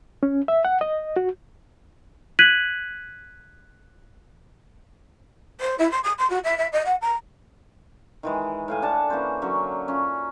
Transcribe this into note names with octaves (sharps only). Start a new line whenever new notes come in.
C#4
E5
F#5
D#5
F#4
F#6 G#6 B6 D#7 F#7
C5
E4
C6
D#6
C6
F#4
E5
E5
D#5
F#5
A#5
D#3 E3 G#3
A2 F5 G#5
D4 F#5 G#5 A5
E3 A#3 C#4 C5
D3 F#3 A#3 C#4
C#4 F4